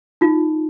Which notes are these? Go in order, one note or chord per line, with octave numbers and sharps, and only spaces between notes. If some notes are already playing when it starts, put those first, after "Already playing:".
D#4 F4